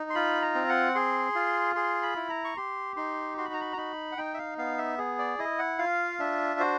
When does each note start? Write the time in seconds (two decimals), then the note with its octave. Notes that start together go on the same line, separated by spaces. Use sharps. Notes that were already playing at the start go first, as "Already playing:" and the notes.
Already playing: D#4
0.10 C6
0.15 F4 B5
0.42 A#5
0.55 C4
0.69 F#5
0.95 G#4 C6
1.35 F4
1.75 G#4 C6
2.03 B5
2.16 E4
2.29 A#5
2.45 C#6
2.57 G4 C6
2.96 D#4 C6
3.38 F#4 C6
3.45 B5
3.53 A#5
3.61 B5
3.73 A#5
3.77 D#4 B5
4.12 F#5
4.17 D#4 G5
4.34 E5
4.38 F5
4.58 B3 F5
4.78 E5
4.98 G#4
5.19 D5
5.38 E4 D#5
5.59 F#5
5.79 F4 F5
6.20 D4 E5
6.60 F#4 C5